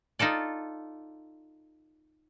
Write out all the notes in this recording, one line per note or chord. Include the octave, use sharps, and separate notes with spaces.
D#4 F4 A4 D5